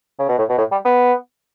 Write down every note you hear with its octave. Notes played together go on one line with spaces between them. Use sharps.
C#3
B2
A2
B2
A2
G3
B3